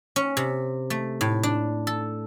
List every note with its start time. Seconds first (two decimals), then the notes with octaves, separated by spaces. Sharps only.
0.16 C#4
0.37 C3
0.90 A3
1.21 A2
1.43 D4
1.87 A4